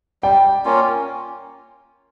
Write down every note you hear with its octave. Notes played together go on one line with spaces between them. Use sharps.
G3 G5
A#3 C#4 F4